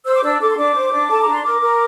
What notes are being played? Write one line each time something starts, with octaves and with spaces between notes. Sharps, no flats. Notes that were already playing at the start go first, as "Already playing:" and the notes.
C5 E6
D6
D4 E6
A4 D6
C6
D4 D6
C5
D4
A4 A5
A#5
D4
C6
A#4 D6
A#4